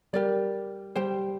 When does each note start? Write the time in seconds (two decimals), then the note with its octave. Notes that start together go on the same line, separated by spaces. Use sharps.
0.13 G3 G4 A#4 D5
0.96 G3 G4 C5 G5